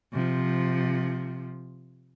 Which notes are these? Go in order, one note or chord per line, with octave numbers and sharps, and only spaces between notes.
C3 F3